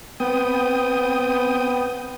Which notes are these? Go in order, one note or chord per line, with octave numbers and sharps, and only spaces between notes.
B3 C4 G5 D#6